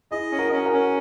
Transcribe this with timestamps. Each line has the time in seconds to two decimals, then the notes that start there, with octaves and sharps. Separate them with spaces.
0.11 E4 G#4 D#5
0.32 C#4
0.39 F#4 A#4
0.52 C#4
0.66 F#4 A#4
0.73 C#4